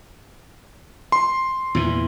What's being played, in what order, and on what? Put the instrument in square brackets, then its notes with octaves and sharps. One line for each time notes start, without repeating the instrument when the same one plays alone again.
[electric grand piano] C6
[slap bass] E2 A#2 E3